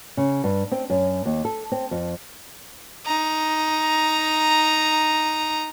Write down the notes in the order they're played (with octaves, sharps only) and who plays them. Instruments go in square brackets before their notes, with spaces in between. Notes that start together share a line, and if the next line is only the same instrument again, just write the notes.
[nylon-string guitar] C#3
G2
C4
F#2
D#2
A4
C4
F2
[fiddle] D#4 A#5